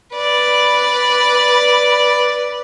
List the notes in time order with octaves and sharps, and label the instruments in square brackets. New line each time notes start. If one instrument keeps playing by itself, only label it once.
[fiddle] B4 D5